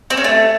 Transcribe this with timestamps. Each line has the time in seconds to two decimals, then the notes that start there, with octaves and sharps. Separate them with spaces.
0.10 C4
0.17 C#4
0.24 A3